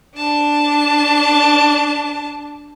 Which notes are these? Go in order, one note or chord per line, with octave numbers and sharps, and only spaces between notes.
D4 A5